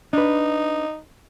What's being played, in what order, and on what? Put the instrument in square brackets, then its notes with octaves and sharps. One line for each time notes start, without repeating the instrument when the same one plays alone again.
[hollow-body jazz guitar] D4 B4 [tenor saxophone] D#4